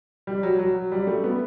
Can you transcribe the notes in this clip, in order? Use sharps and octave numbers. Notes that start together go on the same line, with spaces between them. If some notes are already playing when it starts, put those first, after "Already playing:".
G3
F#3
F#3
G3
A3
B3